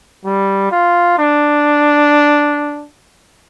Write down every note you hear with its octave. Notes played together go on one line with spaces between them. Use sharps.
G3
F4
D4